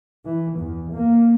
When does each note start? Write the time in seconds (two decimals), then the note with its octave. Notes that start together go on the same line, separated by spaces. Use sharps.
0.25 E3
0.59 E2
0.93 A#3